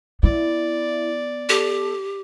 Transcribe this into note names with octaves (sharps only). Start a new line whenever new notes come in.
B3 E4 D5
G4 A4